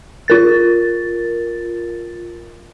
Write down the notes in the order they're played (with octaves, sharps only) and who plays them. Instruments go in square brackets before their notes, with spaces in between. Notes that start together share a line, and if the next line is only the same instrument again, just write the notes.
[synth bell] F4 A#4 A6